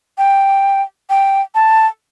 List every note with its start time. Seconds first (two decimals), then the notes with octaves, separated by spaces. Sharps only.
0.18 G5
1.10 G5
1.55 A5